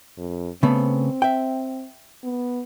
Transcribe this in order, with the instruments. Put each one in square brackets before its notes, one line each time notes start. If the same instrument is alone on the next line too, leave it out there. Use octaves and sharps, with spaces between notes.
[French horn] F2
[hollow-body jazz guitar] C#3 A3 B3 [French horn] C4
[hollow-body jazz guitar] E5 G5
[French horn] B3